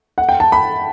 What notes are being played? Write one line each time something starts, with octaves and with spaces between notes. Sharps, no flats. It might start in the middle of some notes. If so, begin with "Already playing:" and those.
F#5
G5
A5
B5